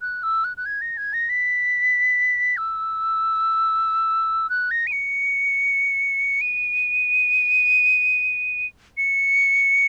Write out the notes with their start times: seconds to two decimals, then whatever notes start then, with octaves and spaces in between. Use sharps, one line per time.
0.01 F#6
0.23 E6
0.44 F#6
0.57 F#6
0.65 G#6
0.81 A#6
0.97 G#6
1.13 A#6
1.29 B6
2.57 E6
4.49 F#6
4.71 A#6
4.87 D#7
4.92 C#7
6.41 D#7
8.97 C#7